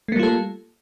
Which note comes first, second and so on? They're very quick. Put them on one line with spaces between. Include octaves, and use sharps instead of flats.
A3 A#3 G3 F4 A4